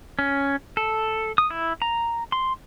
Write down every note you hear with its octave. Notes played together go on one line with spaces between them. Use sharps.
C#4
A4
D#6
E4
A#5
C6